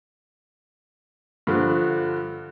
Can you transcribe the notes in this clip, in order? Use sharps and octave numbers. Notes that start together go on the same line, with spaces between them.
G2 D3 F3